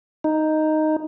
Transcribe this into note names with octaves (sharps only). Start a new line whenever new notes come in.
D#4